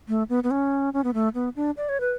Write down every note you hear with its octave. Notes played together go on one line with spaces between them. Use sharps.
A3
B3
B3
C#4
C#4
B3
A3
B3
D4
D5
C#5
B4